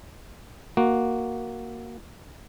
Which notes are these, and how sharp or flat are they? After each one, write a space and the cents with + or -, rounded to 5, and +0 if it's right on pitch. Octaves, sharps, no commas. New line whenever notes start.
A#3 +0 F#4 +0